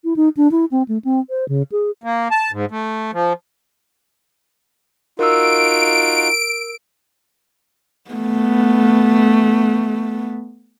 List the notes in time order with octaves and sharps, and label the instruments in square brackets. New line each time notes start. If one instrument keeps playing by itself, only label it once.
[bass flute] E4
D#4
D4
E4
C4
A3
C4
C5
C#3
G#4
[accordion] A#3
A5
G#2
A3
F3
[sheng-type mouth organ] D#4 F4 F#4 [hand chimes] A#4 E6 [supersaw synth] D7
[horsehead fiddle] A3 B3